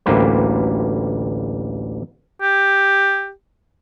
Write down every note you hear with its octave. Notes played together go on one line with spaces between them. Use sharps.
A1 D2 G3 A#3 B4 C5
G4